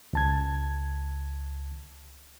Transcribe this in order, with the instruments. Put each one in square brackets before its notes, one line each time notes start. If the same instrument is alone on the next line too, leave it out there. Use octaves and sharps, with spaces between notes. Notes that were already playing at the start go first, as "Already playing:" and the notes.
[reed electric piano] C#2 A5 G#6